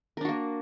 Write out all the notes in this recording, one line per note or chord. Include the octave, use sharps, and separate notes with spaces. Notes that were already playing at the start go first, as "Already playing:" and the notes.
A#3 D4 F#4 A#4